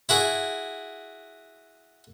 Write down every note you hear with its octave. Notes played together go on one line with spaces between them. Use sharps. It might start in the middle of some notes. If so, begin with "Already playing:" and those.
E4 F#4 G#4